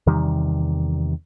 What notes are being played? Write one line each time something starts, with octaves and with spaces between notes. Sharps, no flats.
E2 C3 D#3 G3